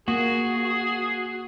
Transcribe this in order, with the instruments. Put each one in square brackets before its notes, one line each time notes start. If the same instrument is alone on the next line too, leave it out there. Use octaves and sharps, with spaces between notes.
[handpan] A#3 [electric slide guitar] F#4 [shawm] G#4